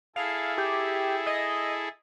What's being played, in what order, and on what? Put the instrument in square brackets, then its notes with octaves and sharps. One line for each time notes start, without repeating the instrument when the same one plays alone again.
[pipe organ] E4 G#4 A4 [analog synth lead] F5
[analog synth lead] G4
D#5